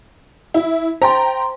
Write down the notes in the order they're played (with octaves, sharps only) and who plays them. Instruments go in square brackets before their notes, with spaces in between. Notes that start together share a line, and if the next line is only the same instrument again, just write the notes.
[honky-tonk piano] E4
[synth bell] C5 C6 [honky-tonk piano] G5 A#5